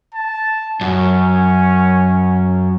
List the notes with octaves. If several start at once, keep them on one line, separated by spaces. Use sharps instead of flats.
A5
F#2 C#4